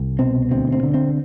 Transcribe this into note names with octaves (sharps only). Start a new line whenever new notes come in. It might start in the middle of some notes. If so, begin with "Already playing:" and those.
Already playing: C2
B2 C4
D2 C4
C4
D3
C4